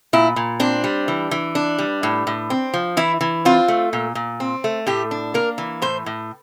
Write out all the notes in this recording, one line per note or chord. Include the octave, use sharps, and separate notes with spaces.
A#2 E4
A#2
C4 D4
G3
E3
E3
D4
G3
A2
A2
C4
F3
E3 E4
E3
C4 F4
A3
A#2
A#2
C4
A3
A2 G4
D4
A#3 A#4
E3
A2 C5
A2